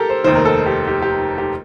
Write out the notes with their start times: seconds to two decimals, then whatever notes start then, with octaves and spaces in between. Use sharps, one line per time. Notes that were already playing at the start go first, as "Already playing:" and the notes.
Already playing: G4 A4 A#4
0.09 C5
0.24 F1 D#2 D#3 C5
0.35 A#4
0.45 A4
0.66 G4
0.87 G4
1.02 G4
1.38 G4